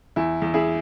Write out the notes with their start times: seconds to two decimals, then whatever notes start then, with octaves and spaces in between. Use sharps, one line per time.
0.16 E2 E4
0.42 E2
0.54 E4 G#4